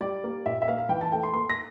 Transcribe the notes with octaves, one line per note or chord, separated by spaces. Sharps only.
G3 D5
A#3
A#2 E5
E5
A#3 F5
F5
E3 G5
A5
A3 G5
C6
A#3 C6
A#6